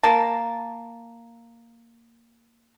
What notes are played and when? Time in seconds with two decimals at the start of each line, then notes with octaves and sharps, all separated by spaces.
0.03 A#3 A5